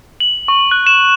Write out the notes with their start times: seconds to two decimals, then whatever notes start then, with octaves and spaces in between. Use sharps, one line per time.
0.20 F#7
0.48 C#6
0.71 F#6
0.87 E7